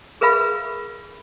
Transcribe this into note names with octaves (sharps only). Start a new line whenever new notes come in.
G#4 A#4 B4 E5 F5 B5